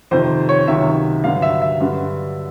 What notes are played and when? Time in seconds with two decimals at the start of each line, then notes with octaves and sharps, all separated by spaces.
0.11 F2 C3 D#3 C5
0.49 C#5
0.67 C#2 C3 D#3 F#3 E5
1.24 G2 D3 F#3 F5
1.42 E5
1.62 E5
1.80 G2 D3 F#3